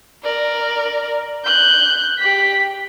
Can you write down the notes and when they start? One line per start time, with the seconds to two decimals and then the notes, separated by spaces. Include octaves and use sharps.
0.23 A#4 D5
1.44 F#6 G6
2.18 G4 B6